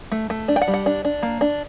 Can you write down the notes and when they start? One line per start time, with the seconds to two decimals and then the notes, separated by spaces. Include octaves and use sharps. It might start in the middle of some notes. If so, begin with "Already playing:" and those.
0.12 A3
0.30 A3
0.48 D4
0.56 G5
0.62 F#5
0.68 G3
0.74 F#5
0.86 D4
1.05 D4
1.23 A#3
1.41 D4